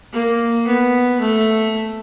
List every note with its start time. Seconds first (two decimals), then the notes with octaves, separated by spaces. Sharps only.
0.13 A#3
0.67 B3
1.20 A3